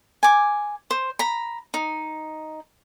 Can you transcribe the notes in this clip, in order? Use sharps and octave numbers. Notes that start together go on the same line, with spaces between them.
G#5 D6
C5
A#5 B5
D#4